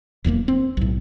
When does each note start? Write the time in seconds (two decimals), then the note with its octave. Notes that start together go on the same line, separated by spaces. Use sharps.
0.24 D1 E2 E3 A#3
0.48 C4
0.77 B1 A2